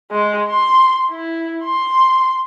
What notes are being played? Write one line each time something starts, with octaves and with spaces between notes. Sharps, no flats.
G#3
C6
E4
C6